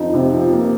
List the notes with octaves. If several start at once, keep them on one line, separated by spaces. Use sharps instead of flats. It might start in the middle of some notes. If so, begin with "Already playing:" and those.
Already playing: F2 D#4
C3
F3
A#3